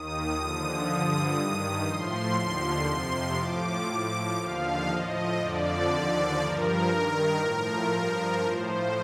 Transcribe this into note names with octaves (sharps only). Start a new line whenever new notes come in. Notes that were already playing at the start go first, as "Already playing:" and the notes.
Already playing: D#2 D#3 D#6
D#2 D3 F3
G2 D3 F3 D#6
G2 D#3
A2 F3 C6
D#2 D3 F3
F2 C3 F3 C6
A2 F3 D6
A2 F3 D6
D#2 D3 F3 F5
A2 F3 D#5
F2 D3 F3 D5
D#2 D3 F3
G2 F3 A#4
G2 D#3
A2 F3 A#4
G2 F3
A2 F3 C5